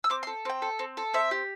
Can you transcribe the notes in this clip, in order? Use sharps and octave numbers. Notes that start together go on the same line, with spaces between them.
E6
C4 D6
C6
A4
C4 G5
A4
C4
A4
C4 E5
G4